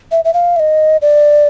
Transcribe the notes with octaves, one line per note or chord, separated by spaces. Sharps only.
E5
E5
F5
E5
D#5
D5